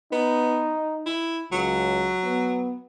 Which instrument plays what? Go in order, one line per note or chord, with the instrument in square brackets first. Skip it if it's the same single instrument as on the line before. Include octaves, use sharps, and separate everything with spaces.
[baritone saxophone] B3 [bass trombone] D#4
[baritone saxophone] E4
[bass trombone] C#2 [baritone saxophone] F#3
[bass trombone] B3